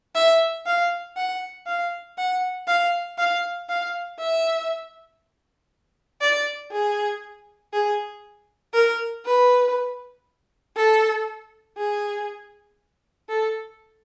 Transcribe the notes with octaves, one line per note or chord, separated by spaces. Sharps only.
E5
F5
F#5
F5
F#5
F5
F5
F5
E5
D5
G#4
G#4
A#4
B4
A4
G#4
A4